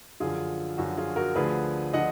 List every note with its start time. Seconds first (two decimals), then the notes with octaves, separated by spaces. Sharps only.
0.20 F#2 D3 F3 F4 G#4
0.78 F#2 D3 F3 F#4
0.97 F4 G#4
1.16 F#4 A#4
1.36 D2 D3 F3 G#4 B4
1.94 D3 F3 D#5 F#5